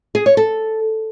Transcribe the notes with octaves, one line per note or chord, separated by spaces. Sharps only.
G#4
C#5
A4